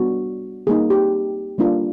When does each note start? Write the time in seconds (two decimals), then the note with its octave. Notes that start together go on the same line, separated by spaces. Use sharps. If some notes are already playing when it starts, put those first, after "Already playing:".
Already playing: G3 B3 D4 F#4
0.67 G3 A#3 D#4 G#4
0.90 G4
1.58 G3 A#3 D4 F4